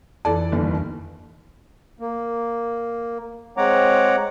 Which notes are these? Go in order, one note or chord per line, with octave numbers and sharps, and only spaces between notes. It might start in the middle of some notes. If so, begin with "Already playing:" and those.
F2 E3 A4 D5
G1 D#2 E3
A#3
G#3 C4 C#5 F#5 A#5 D6